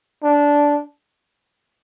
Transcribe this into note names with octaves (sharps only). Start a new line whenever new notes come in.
D4